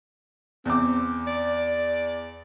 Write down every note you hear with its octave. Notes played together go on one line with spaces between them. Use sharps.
E2 C4 D6
D5